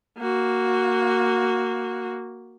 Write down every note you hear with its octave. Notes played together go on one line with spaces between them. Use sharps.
A#3 F#4